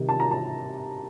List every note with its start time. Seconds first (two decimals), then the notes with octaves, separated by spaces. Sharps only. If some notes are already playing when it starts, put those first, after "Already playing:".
Already playing: C3 D#3 G3
0.09 A5
0.20 A#5
0.31 A5